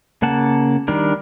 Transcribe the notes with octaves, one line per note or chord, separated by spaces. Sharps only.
C#3 A#3 F#5 A5
D#3 G3 D4 A#4